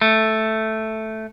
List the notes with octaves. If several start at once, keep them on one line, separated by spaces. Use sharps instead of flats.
A3